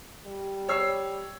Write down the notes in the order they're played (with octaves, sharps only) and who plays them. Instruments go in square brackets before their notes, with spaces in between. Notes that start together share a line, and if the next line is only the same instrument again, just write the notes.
[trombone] G3
[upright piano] C#5 E6 C7